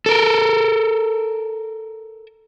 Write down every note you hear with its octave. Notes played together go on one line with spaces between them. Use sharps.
A4 A#4